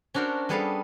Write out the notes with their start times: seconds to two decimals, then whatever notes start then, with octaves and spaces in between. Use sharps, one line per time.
0.14 C#4 D4 F#4 A#4 C5
0.49 G3 B3 G#4 A4 B4 F5